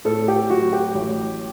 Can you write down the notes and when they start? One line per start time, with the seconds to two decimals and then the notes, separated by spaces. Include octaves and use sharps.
0.05 A2 A4
0.28 G4
0.50 F#3 F#4
0.72 G4
0.95 A1